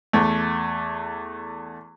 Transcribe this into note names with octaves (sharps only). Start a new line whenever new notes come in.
E2 A3